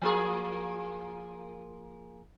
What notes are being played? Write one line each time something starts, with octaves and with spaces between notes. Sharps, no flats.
F3 A#3 G#4